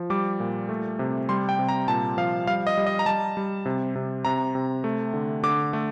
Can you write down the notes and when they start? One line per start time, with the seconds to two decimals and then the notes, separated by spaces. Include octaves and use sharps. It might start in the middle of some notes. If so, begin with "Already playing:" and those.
Already playing: F3
0.10 G3 D6
0.40 A#2
0.69 A3
0.99 C3
1.29 G3 C6
1.49 G5
1.59 C3
1.69 A#5
1.88 A#2 A5
2.17 F3 F5
2.47 G3 F5
2.67 D#5
2.77 G3
2.87 D#5
2.99 A#5
3.06 G3 A5
3.37 G3
3.66 C3
3.96 C3
4.25 C3 A#5
4.55 C3
4.84 A3
5.14 D3
5.43 D3 D6
5.73 A3